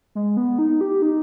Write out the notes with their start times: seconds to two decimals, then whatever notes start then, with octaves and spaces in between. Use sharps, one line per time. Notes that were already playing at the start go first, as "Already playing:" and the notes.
0.15 G#3
0.37 B3
0.58 D#4
0.81 G4
1.02 D#4